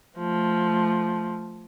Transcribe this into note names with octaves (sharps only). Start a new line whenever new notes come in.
F3 A3